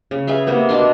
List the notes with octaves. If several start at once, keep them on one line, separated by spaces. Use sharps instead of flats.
C#3
G#4 B4 E5 F5
C3 A#3 B3
B2 D4 A5 C6